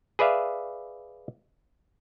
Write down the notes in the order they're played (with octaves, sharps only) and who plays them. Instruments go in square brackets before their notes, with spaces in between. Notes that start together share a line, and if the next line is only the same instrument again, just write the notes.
[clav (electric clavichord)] G#4 B4 D5 E5 F5